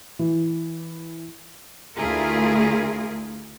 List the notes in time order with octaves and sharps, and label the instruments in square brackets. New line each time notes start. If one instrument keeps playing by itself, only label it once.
[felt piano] E3
[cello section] D2 A3 E4 F4 G#4 A#4